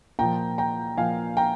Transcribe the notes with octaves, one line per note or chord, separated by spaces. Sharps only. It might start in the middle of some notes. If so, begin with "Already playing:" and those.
A#2 F3 G5 A#5
G5 A#5
A#2 F3 F5 G#5
G5 A#5